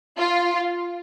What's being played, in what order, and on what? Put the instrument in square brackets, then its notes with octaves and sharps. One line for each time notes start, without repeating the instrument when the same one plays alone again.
[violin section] F4